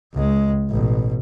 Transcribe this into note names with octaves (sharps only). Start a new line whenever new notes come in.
C#2 G#3
A1 B2